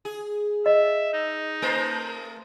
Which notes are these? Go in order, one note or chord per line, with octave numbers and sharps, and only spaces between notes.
G#4
D#5 E5
D#4
A3 A#4 C5